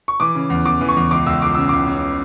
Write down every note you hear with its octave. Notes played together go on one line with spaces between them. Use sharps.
C#6
E3 D6
C#3
E2
E2 D6
E3
C#6
E2
C#2 D6
C#2 E6
C#2 D6
C#3 E6
C#2 D6
C#3